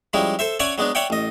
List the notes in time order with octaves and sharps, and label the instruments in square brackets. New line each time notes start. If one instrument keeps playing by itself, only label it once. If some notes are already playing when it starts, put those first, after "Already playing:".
[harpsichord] F3 G3 G#3 C#4 E4
A4 C5 E5
C#4 C#5 D5 E5 F#5 G#5
F#3 G#3 B3 D4
C#5 D5 E5 F#5 G5
A1 D#5